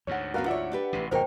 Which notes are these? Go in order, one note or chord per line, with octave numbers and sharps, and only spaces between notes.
D2 G#2 C#5 F#5
B3 C#4 F#4 A#4 B4 F5
F4 C#5 D5 E5 F#5
D4 G4 B4
A1 C3
G#1 D#2 B2 A#4 C5 G5